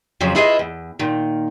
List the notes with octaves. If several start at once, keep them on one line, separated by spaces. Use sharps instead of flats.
F2 C#3 F3 F#3
E4 F4 G#4 B4 C#5 D#5
E2
A#2 D#3